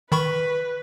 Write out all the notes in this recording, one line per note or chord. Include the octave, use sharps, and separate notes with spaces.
D#3 B4 B5 C#6